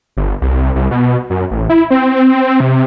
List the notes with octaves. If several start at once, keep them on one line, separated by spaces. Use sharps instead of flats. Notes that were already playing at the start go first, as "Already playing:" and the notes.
G1
C2
C2
B2
F#2
A1
E4
C4
C3